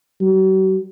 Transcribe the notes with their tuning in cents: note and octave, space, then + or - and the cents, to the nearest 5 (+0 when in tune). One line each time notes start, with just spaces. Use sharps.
F#3 +45